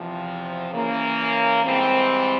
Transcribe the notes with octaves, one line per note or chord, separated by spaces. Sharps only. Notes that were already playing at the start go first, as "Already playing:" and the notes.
Already playing: E2 C3 F3
C#3 E3 A#3 C#4
G#2 E3 G3 C4